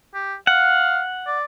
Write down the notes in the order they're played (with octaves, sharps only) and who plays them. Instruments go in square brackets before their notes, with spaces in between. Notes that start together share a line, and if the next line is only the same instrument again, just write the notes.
[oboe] G4
[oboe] F5 [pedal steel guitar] F#5
[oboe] D5